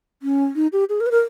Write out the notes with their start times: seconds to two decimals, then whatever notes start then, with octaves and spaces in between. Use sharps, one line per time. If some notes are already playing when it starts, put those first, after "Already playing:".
0.22 C#4
0.56 D#4
0.73 G4
0.89 G#4
1.01 A#4
1.06 B4
1.11 A#4